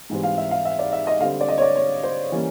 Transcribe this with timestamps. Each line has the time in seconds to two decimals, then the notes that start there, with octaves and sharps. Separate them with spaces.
0.10 G#2 E3 G3 C4
0.23 F5
0.38 E5
0.51 F5
0.65 E5
0.79 D5
0.93 E5
1.07 D#5
1.20 D3 G3 C4 F5
1.41 D5
1.48 D#5
1.58 C#5
1.62 D5
1.75 C#5
2.03 C5
2.32 E3 G3 A#3 C#4